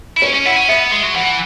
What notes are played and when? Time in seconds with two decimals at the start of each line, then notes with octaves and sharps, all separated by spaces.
0.17 E4
0.22 C#4 C#5
0.34 C#4
0.45 E4 F#5
0.56 C#4
0.69 B3 E5
0.92 G#3
1.03 F#3
1.15 E3 F#5